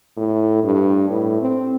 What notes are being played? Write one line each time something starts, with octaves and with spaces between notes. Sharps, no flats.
A2
G2
A2
C4